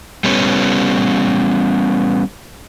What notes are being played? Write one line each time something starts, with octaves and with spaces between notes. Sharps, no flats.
G3 B3 C#4